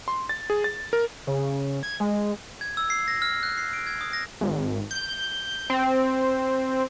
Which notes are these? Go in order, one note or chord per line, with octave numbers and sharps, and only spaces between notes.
C6
A6
G#4
A6
A#4
C#3
G#6
G#3
G#6
E6
C7
A#6
F6
F#6
C7
D7
G#6
D#6
A#6
G#1
G6
C4